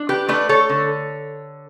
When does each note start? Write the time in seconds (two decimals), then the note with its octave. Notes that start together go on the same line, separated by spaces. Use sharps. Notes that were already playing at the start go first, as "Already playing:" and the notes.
Already playing: D4
0.09 G4 B4
0.28 A3 B4 D5
0.49 A4 C#5
0.69 D3